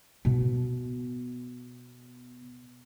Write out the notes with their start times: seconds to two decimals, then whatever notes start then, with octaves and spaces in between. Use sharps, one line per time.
0.25 B2 B3